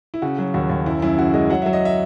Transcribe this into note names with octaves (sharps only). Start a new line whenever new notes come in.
E4
C#3 F#4
F#3
D#2 F#4
D#2
F#2 E4
F#2 E4
C#3 F#4
G#3 D#5
F#3 F#5
F#3 E5
D#5
E5